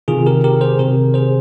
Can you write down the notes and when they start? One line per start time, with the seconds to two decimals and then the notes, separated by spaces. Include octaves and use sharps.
0.08 C3 D#3 F4 G#4
0.26 G4 A#4
0.44 G4 A#4
0.61 G#4 C5
0.79 C3 D#3 G4 A#4
1.14 G#4 C5